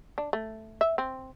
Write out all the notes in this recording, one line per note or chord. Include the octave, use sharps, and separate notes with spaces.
D4
A3
E5
C4